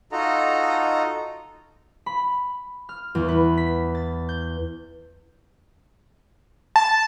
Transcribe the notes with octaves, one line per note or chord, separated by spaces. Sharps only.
D#4 F4 F#4 A4 D#5 A#5
B5
F6
E2
B4
B6
A6
G6
A5